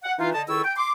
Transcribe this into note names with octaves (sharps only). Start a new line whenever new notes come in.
F#5
E3 D#4 F4
D3 D#5 A5
C#2 D#3 E4 A4 C#6 E6
G5
C6 D6